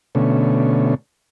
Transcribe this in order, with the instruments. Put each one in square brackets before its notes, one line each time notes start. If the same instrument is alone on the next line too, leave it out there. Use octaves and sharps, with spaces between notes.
[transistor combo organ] B2 D3 A3 C#4